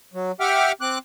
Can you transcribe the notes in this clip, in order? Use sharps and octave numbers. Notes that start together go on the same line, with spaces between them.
F#3
G4 E5 F#5 G5 D6 F6
C4 D6 F#6